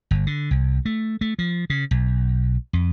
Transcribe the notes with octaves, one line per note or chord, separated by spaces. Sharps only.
G1
D3
C2
A3
A3
F3
C#3
B1
F2